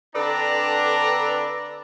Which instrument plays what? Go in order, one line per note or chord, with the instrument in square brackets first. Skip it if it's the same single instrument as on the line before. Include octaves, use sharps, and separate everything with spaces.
[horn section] D3 C4 D4 [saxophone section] A4 B4 D5 [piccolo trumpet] A#5